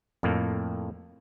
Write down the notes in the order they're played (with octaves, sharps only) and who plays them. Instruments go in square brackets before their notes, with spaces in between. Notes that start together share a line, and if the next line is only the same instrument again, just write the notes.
[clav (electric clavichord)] F2 A2 A#3